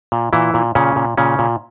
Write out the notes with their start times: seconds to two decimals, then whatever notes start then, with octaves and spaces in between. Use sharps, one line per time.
0.12 A#2
0.33 A#2 E3 E4
0.54 A#2
0.75 A#2 C#3 C#4
0.96 A#2
1.18 A#2 C#3 C#4
1.39 A#2